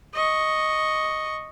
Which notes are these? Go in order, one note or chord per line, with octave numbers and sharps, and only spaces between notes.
D#5 C#6